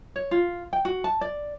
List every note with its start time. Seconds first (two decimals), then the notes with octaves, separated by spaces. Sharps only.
0.16 C#5
0.31 F4
0.73 G5
0.85 F#4
1.04 A5
1.21 D5